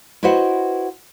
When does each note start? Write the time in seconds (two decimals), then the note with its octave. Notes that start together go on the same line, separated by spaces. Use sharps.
0.23 E4 F#4 B4 C5 D#5 F#5